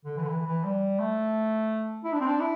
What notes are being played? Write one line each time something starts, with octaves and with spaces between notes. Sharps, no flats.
D3
E3
D3
E3
E3
G3
A3
E4
D4
C4
D4
E4